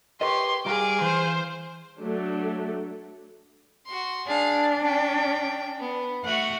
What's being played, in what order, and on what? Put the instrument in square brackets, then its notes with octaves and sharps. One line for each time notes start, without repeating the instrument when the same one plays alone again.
[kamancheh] G4 C#5 [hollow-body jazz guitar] A#4 B4 D#5 [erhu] C6
[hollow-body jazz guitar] G3 A#5 [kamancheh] G#4 F5 [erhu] D6
[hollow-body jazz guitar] E3 [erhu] C5
[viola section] F#3 A3 D4
[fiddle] F#4 C6
[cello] D4 [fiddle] G#4 F5
[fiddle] C#4 G5
B3
[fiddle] A3 F#4 [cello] F#5